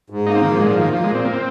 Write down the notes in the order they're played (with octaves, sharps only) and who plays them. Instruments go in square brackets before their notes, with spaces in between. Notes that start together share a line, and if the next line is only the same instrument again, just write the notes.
[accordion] G#2
[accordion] A#3 [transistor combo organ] D#4
[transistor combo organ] C4
[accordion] G#2 [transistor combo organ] D#3
[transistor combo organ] F3
[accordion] A#2 [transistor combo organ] G#3
[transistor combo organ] F3
[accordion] A#3
[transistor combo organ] D#3
[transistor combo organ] F3 [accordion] A#3
[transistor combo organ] G#3
[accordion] A#2 [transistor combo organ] C4
[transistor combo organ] A#3
C4